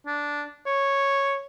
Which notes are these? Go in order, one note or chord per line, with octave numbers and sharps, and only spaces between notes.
D4
C#5